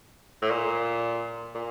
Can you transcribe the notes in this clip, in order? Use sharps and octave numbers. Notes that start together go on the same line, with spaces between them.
A2
A#2
A#2